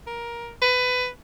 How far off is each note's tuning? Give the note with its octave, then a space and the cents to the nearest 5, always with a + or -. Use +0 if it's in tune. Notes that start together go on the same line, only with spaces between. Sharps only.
A#4 +15
B4 +20